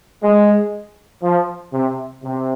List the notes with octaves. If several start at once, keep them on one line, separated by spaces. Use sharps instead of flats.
G#3
F3
C3
C3